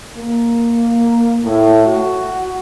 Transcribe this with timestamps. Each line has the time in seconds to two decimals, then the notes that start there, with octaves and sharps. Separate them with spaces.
0.16 A#3
1.43 A2
1.85 F#4